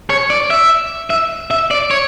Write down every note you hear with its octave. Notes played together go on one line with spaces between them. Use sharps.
C#5
D5
E5
E5
E5
D5
C#5